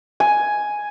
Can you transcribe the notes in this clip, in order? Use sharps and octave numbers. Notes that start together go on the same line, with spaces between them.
G#5